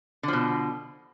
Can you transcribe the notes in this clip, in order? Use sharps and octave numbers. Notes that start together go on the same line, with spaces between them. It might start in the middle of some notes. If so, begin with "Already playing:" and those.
B2 D3 F3